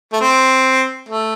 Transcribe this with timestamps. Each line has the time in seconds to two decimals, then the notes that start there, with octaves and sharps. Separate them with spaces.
0.13 A3
0.21 C4
1.09 A3